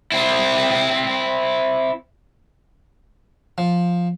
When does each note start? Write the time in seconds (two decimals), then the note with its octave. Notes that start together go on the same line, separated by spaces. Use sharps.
0.12 C4 E4
3.58 F3